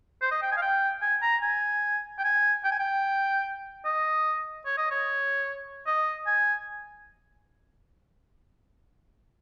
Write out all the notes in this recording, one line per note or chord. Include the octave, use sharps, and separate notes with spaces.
C5
D#5
G5
G#5
F5
G5
G#5
A#5
G#5
G5
G#5
G5
G#5
G5
D#5
C#5
D#5
C#5
D#5
G#5